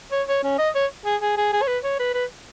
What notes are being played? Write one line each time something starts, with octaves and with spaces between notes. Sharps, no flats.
C#5
C#5
C#4
D#5
C#5
G#4
G#4
G#4
G#4
C#5
B4
C#5
B4
B4